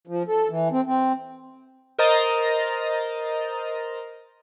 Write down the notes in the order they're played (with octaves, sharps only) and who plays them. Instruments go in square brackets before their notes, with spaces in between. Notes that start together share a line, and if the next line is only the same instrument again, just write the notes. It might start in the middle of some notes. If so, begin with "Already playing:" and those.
[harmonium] F3
A4
E3
C4
C4
[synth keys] A#4 C5 D#5 A#5 A6